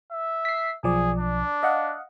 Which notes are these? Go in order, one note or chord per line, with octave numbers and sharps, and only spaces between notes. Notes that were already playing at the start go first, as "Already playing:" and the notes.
E5
B6 C7
B1 F3 G#4 D5
D4
D#5 F5 F#5